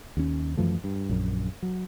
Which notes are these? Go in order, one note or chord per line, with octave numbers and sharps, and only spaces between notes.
D#2 C#4
F#2 E3 F3 A3
G2
A#1 F#2
F#3